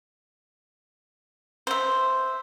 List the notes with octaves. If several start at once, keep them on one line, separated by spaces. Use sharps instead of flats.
C5 E5